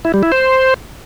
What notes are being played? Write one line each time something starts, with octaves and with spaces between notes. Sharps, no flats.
E4
G3
E4
C5